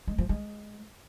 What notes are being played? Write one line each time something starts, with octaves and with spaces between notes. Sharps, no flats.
G#3
F3
G#3